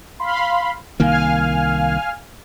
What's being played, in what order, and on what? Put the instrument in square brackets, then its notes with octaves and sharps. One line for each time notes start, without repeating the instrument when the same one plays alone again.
[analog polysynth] F5 B5 C6
[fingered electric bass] C2 D#3 A#3 [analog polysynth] F5 G#5 F6